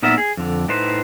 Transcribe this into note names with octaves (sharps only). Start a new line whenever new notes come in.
A#2 B3 D#4 A#4 E5
G#4
F2 D3
A2 D#4 B4 C5